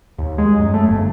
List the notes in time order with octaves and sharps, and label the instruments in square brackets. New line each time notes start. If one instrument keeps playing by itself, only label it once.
[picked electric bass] D#2
G#3
F#2
A3
G1